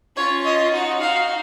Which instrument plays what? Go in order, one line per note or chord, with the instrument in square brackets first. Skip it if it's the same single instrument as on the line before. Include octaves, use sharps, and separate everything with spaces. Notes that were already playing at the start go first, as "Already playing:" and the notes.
[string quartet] C#4 F4 [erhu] C#5
[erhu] D#5
[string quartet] D#4 F#4
[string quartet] D#4 F#4 [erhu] F5